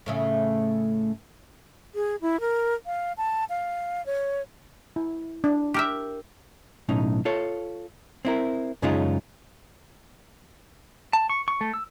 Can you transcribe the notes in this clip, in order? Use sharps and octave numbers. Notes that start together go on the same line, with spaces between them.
A2 C#3 A3
G#4
E4
A#4
F5
A5
F5
C#5
E4
D4
G4 A#4 E5
B1 A2 C#4 D#4
F4 A4 C#5
C4 E4 A#4
F#2 C#3 G#3 C#4 D#4 F4
A5
C#6
C#6
A3
E6